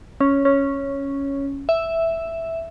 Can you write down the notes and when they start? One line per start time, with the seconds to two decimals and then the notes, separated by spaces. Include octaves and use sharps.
0.21 C#4
0.45 C#4
1.69 E5